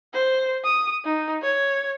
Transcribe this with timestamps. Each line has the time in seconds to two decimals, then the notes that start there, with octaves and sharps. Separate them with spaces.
0.14 C5
0.65 D#6
1.05 D#4
1.43 C#5